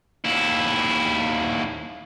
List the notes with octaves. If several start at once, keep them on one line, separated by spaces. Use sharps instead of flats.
D#2 E4